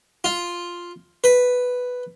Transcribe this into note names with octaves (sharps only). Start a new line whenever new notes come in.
F4
B4